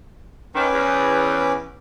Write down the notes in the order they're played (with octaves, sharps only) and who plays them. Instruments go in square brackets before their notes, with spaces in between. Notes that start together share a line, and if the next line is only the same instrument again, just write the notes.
[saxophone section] D#3 [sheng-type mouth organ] C#4 B4 D6
[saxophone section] E2